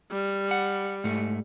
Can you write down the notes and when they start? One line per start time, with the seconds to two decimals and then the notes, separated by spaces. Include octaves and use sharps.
0.12 G3
0.51 F#5
1.04 G#2 A3